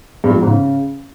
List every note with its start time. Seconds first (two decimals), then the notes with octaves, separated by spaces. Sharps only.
0.24 G2
0.30 F3
0.36 G#3
0.41 G#2
0.47 C#3